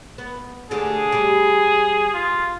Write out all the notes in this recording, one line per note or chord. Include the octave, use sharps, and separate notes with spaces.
B3
D2 D3 G4 G#4
G3 G4
F4